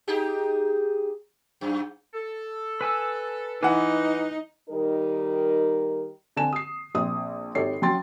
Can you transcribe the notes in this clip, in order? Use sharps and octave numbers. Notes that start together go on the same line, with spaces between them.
D#4 G4 G#4
F#2
A4
B4 G#5 E6
E3 D#4 B4 F#5
D#3 G3 D#4 A#4
D3 C4 G#5 A5 E7
D#6 C7
A#1 C4 D#6
G#1 G4 A4 C#5 C7
F#3 C#4 G5 C6 A6